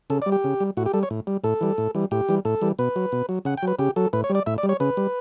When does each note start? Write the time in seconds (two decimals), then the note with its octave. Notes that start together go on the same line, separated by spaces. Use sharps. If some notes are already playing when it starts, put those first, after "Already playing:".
0.10 C#3 A4
0.22 D5
0.26 G3
0.32 G4
0.44 C#3
0.60 G3
0.77 A2 F#4
0.86 G4
0.93 G3 A4
1.03 C#5
1.10 A2
1.27 G3
1.44 A2 A4
1.61 E3 G3
1.78 A2
1.95 E3 G3
2.11 A2 G4
2.28 E3 G3
2.45 A2 A4
2.62 E3 G3
2.79 B2 B4
2.96 F#3
3.12 B2
3.29 F#3
3.45 C#3 F#5
3.57 G5
3.63 F#3 B4
3.79 C#3 G4
3.96 F#3 A4
4.13 A2 B4
4.24 C#5
4.30 G3
4.35 D5
4.46 A2 E5
4.58 D5
4.63 G3
4.69 C#5
4.80 C#3 B4
4.97 G3